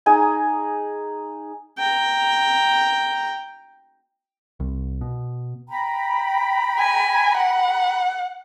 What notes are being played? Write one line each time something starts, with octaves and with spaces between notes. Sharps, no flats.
D#4 G#4 G#5 A#5
G5 A#5
C2
B2
G5 A#5 B5
G#5
F#5